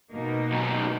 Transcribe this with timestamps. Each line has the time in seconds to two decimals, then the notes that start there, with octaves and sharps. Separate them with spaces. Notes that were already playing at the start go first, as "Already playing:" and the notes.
0.12 B2 A#3 D#4
0.52 F#2 D#3